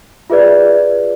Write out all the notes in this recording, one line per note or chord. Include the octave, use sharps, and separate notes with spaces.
F4 G#4 B4 D5 E5